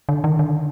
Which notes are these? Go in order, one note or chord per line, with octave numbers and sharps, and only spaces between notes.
D3
D#3
D3